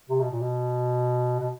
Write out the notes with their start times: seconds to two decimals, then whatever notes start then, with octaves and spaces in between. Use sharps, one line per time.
0.09 C3
0.20 B2
0.31 A#2
0.41 B2
1.40 B2